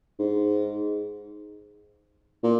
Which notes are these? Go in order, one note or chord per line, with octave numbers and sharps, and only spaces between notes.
G#2
A#2